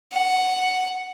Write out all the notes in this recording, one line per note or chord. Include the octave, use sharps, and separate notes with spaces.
F#5